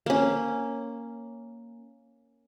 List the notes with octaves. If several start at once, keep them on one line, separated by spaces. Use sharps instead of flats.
A#3 C#4